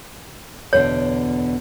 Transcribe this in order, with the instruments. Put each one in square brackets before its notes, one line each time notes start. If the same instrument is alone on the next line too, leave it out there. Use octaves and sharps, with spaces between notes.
[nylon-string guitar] E2 B2 D3 [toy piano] C#5